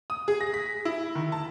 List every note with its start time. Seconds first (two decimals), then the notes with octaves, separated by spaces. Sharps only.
0.10 D#6
0.28 G#4
0.41 A#6
0.54 B6
0.85 E4
1.15 D#3
1.32 A5